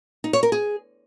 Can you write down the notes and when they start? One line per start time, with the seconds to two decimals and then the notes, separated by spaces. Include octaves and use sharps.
0.24 D#4
0.33 C#5
0.43 A#4
0.52 G#4